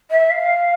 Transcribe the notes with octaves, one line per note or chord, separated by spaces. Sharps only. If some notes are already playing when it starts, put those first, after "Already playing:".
E5
F5